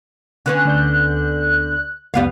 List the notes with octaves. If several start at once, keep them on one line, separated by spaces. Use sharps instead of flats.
D3 B3 C#4 F#6
D2 D5 G6
C#2 F#2 G3 B3 F5